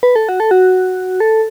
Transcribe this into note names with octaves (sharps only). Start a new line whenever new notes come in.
B4
A4
F#4
A4
F#4
A4